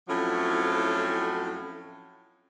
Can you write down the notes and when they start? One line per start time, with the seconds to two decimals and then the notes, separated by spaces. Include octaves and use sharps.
0.08 F2 A2 F3 F#3 C#4 E4